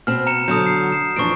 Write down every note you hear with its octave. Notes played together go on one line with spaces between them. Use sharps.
B2 C4 F6
A#5 C#7 E7
D3 F#3 D#6 G6
C7 C#7
C7 E7
F2 E3 D4 C#6 D7